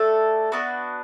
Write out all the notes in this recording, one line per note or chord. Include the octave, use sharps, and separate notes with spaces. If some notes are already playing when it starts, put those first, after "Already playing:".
Already playing: A3 D4 A4
B3 D4 F#4 B4